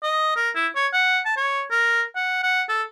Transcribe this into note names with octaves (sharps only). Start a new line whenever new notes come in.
D#5
A#4
E4
C#5
F#5
A5
C#5
A#4
F#5
F#5
A4